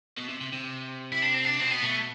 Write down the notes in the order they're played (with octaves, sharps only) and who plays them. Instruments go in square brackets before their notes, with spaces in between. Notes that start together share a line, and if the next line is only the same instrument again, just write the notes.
[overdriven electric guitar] B2
C3
C3
C3
[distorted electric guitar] E4
D4
C4
D4
[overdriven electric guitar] B2 [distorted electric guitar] C4
[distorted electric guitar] B3
[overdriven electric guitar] B2 [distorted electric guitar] A3